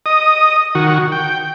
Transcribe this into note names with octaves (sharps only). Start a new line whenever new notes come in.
D#5 D#6
D#3 F#4
G5